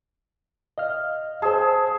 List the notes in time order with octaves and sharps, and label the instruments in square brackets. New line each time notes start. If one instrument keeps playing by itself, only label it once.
[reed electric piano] D#5 F5 F6
[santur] G#4 E6 [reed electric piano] C5 A5